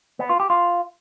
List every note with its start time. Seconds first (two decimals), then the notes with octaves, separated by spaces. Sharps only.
0.19 B3
0.29 F4
0.40 G4
0.50 F4